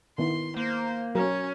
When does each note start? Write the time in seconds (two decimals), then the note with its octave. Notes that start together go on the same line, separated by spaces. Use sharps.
0.18 D#3 B3 E4 C6
0.57 A#3 C5
1.15 F#3 C#4 A#4